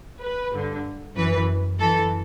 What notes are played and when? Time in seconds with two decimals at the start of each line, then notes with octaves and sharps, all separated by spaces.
0.21 B4
0.52 G2 D3
1.15 F#2 E3 B4
1.79 F#2 E3 A4